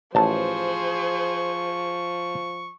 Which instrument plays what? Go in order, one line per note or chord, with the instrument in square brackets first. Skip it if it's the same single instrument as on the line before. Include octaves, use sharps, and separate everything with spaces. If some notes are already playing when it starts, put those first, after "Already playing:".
[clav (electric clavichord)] A1 A5 [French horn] F3 [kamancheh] G#4 C5 [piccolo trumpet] C#6